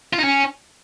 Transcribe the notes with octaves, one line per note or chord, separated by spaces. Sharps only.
F4
D#4
C#4